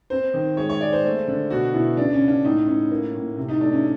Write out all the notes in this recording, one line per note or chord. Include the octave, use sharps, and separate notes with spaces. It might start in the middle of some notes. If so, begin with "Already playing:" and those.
C4 C5
D#3
G#3 C#5
C#5
G#3 D5
C5
A3
D3
B2 F#4
B2 E4
C#3 D4
C#4
C#3
D4
A2 D#4
A2 C#4
A#3
A2
C3
D#4
A3 D4
C#4